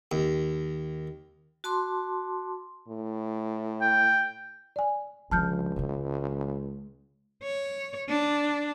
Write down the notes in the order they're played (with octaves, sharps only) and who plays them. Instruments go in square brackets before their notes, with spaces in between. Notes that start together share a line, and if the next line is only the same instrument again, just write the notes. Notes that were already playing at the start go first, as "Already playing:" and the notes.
[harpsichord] D#2
[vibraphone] F#4 A5 C6 D6
[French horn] A2
[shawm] G5
[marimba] D5 G#5
[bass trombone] C#2 [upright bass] D3 F3 [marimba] A5 F6 G6
[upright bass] C#3 G#3
[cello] C#5
D4